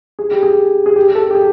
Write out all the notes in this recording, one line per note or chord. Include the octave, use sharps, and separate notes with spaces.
G#4
G4
G#4
G#4
G4
A4
G4
G#4